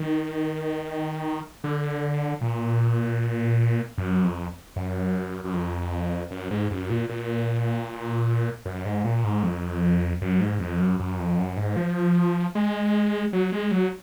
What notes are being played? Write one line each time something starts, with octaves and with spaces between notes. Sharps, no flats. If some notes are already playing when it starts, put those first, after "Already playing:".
Already playing: D#3
D3
A#2
F#2
F2
F#2
F#2
F2
F#2
G#2
F#2
A#2
A#2
F#2
G#2
A#2
G#2
F2
F#2
G#2
F2
F#2
F#2
F2
F#2
G#2
F3
G#3
F#3
G#3
F#3